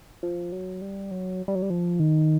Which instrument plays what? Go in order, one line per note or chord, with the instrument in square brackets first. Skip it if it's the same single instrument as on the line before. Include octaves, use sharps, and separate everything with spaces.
[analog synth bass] F3
F#3
G3
F#3
G3
F#3
G3
F3
D#3